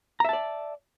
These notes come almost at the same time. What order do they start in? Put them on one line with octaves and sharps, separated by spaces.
A#5 E5 A5 D5